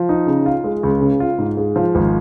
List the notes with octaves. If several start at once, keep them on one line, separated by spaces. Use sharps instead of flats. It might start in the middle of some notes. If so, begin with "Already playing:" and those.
Already playing: F3
D#4
C#3
F4
G#3
C#2
C#3
F4
G#2
G#3
F3
G#1